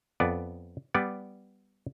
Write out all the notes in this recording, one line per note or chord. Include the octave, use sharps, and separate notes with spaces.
F2 B3 D5
G3 B3 D5